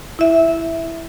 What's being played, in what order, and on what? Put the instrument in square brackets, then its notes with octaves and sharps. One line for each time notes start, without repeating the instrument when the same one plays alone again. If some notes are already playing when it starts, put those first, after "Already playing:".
[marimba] E4 E5